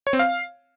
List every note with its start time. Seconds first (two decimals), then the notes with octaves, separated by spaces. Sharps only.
0.07 C#5
0.13 C4
0.19 F5